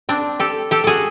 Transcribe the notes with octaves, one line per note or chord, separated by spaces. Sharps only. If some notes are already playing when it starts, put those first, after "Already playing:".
C4 D4
G4 A4
G4 A4
F#4 G#4 A4